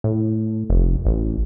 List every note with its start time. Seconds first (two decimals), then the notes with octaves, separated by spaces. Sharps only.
0.04 A2
0.70 F1
1.05 A1